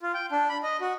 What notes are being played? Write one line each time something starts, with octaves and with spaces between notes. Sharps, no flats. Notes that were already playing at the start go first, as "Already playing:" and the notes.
F4
G5
D4
B5
D#5
F#4